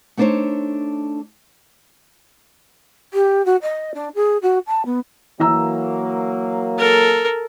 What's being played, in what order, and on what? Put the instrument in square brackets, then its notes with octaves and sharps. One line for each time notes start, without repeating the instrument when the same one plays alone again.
[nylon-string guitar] A3 B3 D4 D#4 C5 C#5
[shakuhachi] G4
F#4
D#5
D4
G#4
F#4
A5
B3
[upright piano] E3 A#5 E6 [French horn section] F#3 A#3
[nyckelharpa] A4 A#4